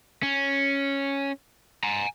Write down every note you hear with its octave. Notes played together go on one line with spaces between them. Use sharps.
C#4
G#5 A#5